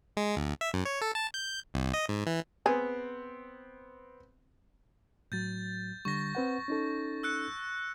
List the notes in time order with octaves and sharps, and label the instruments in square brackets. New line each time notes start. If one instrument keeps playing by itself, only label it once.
[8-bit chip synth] G#3
D2
E5
F#2
C#5
A4
A5
G6
C2
D#5
G#2
E3
[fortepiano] B3 C4 [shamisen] G#4
[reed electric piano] A2 F#3 [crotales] G6 A6
[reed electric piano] D3 G3 [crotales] C#6 A#6
[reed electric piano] C4 B4 F#5
C#4 D#4 A4
[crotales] E6 F#6 C#7